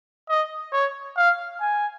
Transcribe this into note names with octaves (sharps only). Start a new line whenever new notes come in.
D#5
C#5
F5
G#5